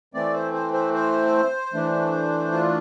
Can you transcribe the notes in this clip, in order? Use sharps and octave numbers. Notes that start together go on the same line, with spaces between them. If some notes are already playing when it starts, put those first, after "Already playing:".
E3 A3 C4 D5
C5
C5
C5
C5
E3 A3 D4
F4